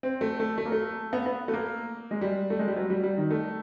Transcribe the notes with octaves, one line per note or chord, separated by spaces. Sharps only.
C4
A3
A3
A3
A#3
A3
B3
B3
A3
A#3
G#3
G3
A3
G#3
G3
F#3
G3
G3
D#3
A3